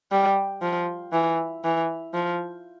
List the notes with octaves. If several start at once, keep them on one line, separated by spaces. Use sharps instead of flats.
G3
F3
E3
E3
F3